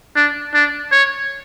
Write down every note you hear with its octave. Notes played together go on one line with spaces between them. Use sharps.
D4
D4
C#5